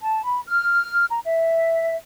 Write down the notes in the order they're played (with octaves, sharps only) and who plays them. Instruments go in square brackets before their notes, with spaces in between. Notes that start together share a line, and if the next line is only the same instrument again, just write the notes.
[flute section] A5
B5
F6
A#5
E5